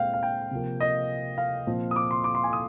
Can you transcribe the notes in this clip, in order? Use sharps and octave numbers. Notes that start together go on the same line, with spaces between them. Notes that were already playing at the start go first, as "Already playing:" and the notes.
Already playing: A#2 G#3 C4 F5 G5
F5
G5
C3 F3 A#3
D#5
F5
A#2 F3 C4
D#6
D6
C6
D6
C6
G#5
D#6